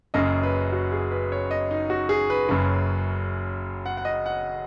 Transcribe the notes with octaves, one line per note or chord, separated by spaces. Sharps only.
F#1 F#2 C#3 D#5
B4
F#4
G#4
B4
C#5
D#5
D#4
F#4
G#4
B4
F#1 F#2 C#3
F#5
F#5
D#5
F#5